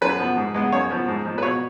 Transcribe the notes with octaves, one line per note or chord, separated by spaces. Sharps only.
F#2 B4
F3 B3
G#2
G#3 B3
F#2 C#5
F3 B3
G#2
F3 G#3
B4
B2 C#5